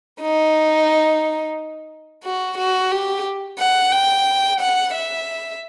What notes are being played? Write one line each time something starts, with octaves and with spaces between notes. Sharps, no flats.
D#4
F#4
F#4
G4
F#5
G5
F#5
E5